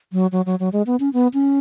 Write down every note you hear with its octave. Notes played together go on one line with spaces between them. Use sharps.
F#3
F#3
F#3
F#3
G#3
B3
C#4
B3
C#4